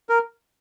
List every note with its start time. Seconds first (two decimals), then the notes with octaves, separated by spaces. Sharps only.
0.09 A#4